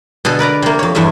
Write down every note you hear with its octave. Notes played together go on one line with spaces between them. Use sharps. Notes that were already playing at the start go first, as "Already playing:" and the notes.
B2 D3 G#4 A4
A#4 B4 D5 A#5
C3 A#3
F2 C#5
E2 G2 G#3 E5